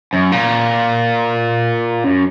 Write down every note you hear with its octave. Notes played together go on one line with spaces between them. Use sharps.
F#2
A#2
F#2